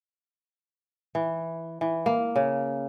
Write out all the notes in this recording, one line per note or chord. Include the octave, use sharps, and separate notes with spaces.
E3
E3
A#3
C#3